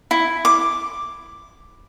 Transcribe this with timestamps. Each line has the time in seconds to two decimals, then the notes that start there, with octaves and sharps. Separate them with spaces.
0.11 E4
0.45 D6